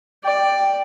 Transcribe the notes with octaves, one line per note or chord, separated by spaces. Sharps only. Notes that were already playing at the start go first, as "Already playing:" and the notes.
D5 G5